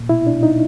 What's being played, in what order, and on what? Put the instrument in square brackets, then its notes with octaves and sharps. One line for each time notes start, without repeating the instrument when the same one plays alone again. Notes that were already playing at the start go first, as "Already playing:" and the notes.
Already playing: [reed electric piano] A#2
B2 E4
D4
B2
D#4